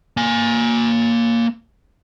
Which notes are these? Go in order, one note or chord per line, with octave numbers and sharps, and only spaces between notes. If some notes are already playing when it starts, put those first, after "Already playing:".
A#3 G#5